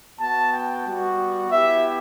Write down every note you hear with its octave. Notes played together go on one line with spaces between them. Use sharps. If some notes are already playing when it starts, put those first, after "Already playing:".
B3 F#4 A5
G5
G3 B3 F#4
B3 E4 G4 E5